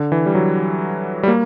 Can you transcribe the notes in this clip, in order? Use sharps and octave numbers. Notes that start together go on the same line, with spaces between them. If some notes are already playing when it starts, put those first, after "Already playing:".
Already playing: D3
E3
G3
F#3
G3
A#3